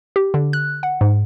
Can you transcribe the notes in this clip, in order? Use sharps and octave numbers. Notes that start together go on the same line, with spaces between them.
G4
D3
F#6
F#5
G#2